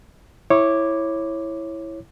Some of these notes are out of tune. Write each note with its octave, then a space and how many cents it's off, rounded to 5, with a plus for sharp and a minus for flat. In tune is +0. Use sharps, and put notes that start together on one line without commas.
E4 +0 C#5 -15 D6 +0